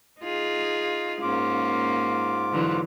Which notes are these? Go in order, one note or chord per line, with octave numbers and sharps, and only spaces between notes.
D#4 F4 G#4
G#2 A#3 C#4 F4 D6
D3 E3 F#3